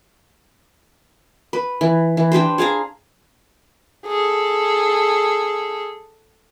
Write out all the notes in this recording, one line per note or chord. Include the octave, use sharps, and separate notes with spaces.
B4
E3
E3
D4 G4 B4 C5
G#4 F5 G#5 A#5
G#4 A4